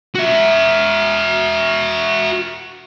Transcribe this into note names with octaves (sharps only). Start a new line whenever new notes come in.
F#4 E5